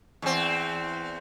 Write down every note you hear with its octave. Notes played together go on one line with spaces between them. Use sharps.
E2 C4